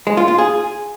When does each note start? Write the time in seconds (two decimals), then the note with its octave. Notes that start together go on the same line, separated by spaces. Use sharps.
0.07 G#3
0.17 F4
0.28 F4
0.38 G#4